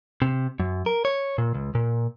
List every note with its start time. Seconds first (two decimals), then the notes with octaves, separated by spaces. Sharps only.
0.22 C3
0.60 F#2
0.86 A#4
1.05 C#5
1.38 A#2
1.54 C#2
1.75 A#2